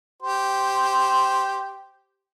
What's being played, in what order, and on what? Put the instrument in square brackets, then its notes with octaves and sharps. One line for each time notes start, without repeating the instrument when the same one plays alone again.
[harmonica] G4 C5